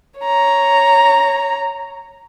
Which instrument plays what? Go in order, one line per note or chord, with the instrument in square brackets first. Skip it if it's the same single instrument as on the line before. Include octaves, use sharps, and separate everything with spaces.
[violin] C#5 A#5